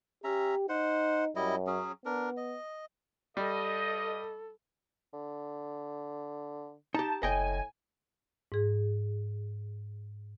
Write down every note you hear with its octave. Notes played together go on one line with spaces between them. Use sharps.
C#4 G4 E5 A#5
D#4 C5 F#5
F#2 G3 E4 D#5
F#3 C#4 G#4
B3 D4 A#4
D#5
G2 G3 A4 D#5
D3
D#4 G4 A5
F#1 A2 D#5 G5 G#5
G#2 G#4